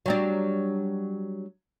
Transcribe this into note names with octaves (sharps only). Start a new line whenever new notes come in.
F#3 G3 D4